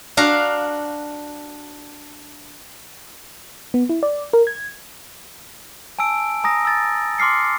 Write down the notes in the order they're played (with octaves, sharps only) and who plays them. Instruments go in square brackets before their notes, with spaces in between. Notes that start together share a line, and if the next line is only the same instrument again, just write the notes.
[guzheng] D4 F#4 F5 A#5
[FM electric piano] B3
E4
D5
A#4
G#6
[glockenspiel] G#5 A5 E6 D7
G#5 A#5 D#6 A#6
E6 A6
C6 D6 F6 C7 C#7